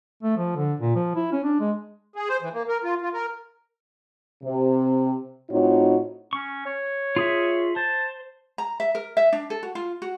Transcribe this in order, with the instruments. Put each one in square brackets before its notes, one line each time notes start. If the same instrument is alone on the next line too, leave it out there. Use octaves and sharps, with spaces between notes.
[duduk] A3
F3
D3
A#2
F3
E4
C#4
D4
G#3
[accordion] G#4
C5
E3
A#3
A#4
F4
F4
A#4
[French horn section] C3
A2 C4 D#4 F4 F#4 C#5
[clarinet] C#4 [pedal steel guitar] C#6
[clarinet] C#5
[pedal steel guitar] F4 G#4 E5
[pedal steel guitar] C5 [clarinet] A5
[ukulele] A#5
E5
A#4
E5
D4
A4
F#4
F4
F#4